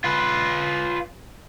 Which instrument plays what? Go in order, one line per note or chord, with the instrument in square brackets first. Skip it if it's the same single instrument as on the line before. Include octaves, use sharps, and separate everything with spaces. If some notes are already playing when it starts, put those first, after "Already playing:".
[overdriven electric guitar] F4 B4